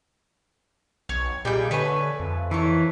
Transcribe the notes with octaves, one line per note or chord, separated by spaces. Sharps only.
B1 C#5
A#2 G3 D#4 G#4 G5 G6
D3 A3 B4 C#5 G#5
F2
D#3 E3 A4 C#5